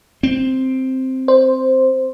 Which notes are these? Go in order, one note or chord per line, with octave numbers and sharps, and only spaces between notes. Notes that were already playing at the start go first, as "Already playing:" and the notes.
C4
C5